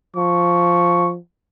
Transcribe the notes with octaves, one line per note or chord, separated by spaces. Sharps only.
F3 C#6